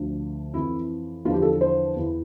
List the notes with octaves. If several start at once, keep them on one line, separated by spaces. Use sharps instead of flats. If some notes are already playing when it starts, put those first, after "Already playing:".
Already playing: D2 D3 F3
F2 E3 E4
E2 D3 F3 F4
G4
A4
C5
E2 E3